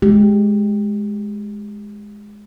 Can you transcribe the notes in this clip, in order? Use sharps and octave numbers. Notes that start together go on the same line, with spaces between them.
G#3 G4